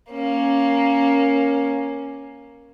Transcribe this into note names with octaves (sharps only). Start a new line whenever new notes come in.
A#3 C#4